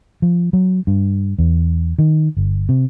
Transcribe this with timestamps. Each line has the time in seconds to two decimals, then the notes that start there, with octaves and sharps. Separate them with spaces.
0.22 F3
0.53 F#3
0.87 G2
1.39 E2
1.98 D#3
2.37 G1
2.69 C3